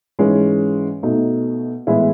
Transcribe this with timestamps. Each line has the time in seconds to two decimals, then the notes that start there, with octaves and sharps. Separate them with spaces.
0.19 G#2 E3 G#3 C#4
1.03 B2 A3 D#4
1.87 A2 E3 G#3 B3 E4